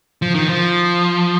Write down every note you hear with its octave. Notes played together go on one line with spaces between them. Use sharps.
F3
D#3
F3